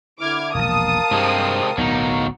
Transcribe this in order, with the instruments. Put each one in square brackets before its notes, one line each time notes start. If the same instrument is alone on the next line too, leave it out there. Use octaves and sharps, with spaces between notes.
[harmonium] D3 E4 [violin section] D6 F6 G#6
[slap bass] E1 A#1 [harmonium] A#4 F5 [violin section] A5 D#6
[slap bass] G2 [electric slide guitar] C3 G#3 C4
[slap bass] D1 B1 B3 [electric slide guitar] F#3 D#4